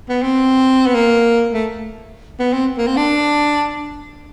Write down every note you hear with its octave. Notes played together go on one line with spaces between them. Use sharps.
B3
C4
B3
A#3
A3
B3
C4
A#3
C4
D4